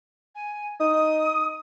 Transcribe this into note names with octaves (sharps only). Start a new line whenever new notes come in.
G#5
D#4 D#6